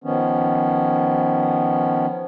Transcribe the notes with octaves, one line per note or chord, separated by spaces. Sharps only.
D#3 F3 B3 C#4